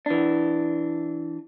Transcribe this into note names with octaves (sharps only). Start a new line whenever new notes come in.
E3 D4